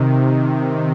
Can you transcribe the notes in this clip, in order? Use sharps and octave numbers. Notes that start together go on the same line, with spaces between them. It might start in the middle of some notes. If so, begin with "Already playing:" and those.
Already playing: C3 D#3